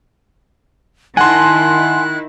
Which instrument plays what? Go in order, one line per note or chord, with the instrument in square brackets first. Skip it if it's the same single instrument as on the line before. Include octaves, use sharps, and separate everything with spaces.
[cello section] D#3 E4 [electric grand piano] F#5 C6 [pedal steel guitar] G#5 A5 [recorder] F#6